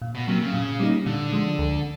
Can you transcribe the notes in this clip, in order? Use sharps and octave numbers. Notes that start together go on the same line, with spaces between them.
A#2
B2
C3 F#3 A#3
C#3
A#2
G3 A#3 D#4
A#2 D3
F3 G#3
D2